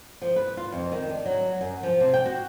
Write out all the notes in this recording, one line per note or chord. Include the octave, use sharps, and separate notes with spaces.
F3
B4
F4
F2
D#3
D4
F#3
F#2
F3
C3
G5
F#4